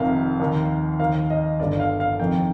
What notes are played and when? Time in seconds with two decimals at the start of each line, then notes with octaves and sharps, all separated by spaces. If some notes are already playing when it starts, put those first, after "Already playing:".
Already playing: F1 F2 C3 D#3 F5
0.40 D#2 D#3
1.00 D#2 D#3 F5
1.30 D#5
1.59 G1 G2 D3 D5
1.80 F5
2.00 F5
2.20 F1 F2 D#3 G5